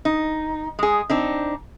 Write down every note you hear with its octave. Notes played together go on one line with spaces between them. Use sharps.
D#4
G#3 G#4
C4 D4 D#4